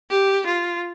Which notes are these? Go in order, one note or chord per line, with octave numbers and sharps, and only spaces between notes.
G4
F4